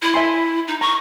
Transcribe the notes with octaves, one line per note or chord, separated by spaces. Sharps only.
E4
E5 G#5 C6
D#4
A#5 C#6